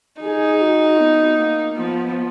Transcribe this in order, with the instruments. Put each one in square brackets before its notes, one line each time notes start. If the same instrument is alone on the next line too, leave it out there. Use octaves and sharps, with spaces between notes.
[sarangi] D#4 [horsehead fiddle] G#4
[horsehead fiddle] F#4
B3
A#3
[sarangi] F3 [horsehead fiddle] B3